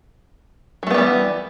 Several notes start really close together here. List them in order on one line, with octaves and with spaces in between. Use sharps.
F#3 A3 B3 G3 E3